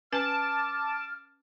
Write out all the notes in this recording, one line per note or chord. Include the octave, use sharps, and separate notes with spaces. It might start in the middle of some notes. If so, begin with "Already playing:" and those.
C#4 B4 G#5 A5 D6 F6